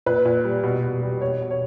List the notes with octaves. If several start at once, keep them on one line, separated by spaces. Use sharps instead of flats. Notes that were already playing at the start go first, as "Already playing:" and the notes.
A#2 B4
A#2
G3
B2
B2
G3
B2 C#5
B2
C#5